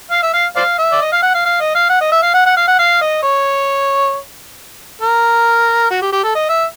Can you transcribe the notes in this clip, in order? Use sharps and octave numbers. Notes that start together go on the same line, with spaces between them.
F5
E5
F5
C5 D5 F5
E5
D5
D#5
F5
F#5
F5
F5
D#5
F5
F#5
D#5
E5
F5
F#5
F#5
F5
F#5
F5
D#5
C#5
A#4
F#4
G4
G4
A4
D#5
E5